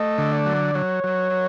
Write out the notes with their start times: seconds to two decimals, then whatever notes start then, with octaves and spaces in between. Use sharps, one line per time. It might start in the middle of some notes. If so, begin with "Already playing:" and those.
Already playing: A3 D#5
0.18 D3
0.32 D5
0.46 F#3
0.75 F#3 C#5
1.04 F#3